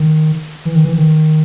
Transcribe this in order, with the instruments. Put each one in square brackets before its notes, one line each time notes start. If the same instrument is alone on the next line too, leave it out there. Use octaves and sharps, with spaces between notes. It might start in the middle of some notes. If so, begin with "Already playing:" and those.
Already playing: [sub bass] D#3
E3
D#3
E3
D#3